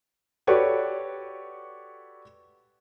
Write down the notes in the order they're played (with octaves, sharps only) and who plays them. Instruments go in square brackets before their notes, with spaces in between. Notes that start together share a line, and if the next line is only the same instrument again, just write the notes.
[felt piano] F#4 G4 A4 B4 C#5 D5